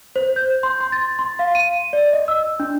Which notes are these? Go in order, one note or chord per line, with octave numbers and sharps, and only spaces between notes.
C5
G6
C6
C6
A6
C6
F5
D#7
D5
D#5
E6
D4